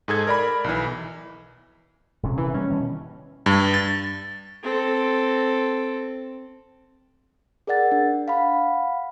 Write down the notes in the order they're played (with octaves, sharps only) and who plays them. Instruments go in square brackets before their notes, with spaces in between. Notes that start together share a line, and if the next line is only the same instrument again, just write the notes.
[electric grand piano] G#2 G#4 A4 G#6
A#4 D5 B5
B1 E3
[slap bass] D#1 C3 C#4
[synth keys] E3
[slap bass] B2 G3 A#3 [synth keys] C#4
[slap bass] B2 D#3 G3
[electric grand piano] G2
A6
[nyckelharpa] C4 A4
[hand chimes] G#4 A#4 D5 F#5 A6
D4
F5 F#5 B5